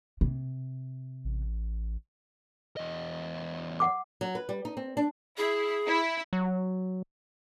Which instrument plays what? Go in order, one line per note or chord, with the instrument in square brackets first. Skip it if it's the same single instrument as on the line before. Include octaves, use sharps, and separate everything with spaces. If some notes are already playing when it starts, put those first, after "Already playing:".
[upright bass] C3
[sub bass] A1
[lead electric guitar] E2 D#5
[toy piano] F#5 D6
[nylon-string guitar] F#3
B4
G3
D#4
C4
D4
[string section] E4 [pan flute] G#4
[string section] E4
[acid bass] F#3